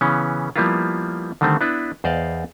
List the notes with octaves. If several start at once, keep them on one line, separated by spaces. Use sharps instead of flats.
C#3 E3 B3 C#4
F3 G3 A#3 B3 E4 F4
D3 D#3 G3 A3 C4
B3 D4 E4 B4
E2 C5 D5 D#5 F5